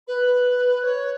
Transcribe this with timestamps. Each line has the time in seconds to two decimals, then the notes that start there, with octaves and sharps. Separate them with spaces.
0.07 B4
0.83 C#5